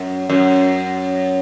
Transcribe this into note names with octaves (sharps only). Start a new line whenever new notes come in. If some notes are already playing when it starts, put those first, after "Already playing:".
Already playing: F#2
F#2